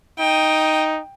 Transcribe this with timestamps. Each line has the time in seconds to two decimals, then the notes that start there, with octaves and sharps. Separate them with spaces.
0.19 D#4 G5 D#6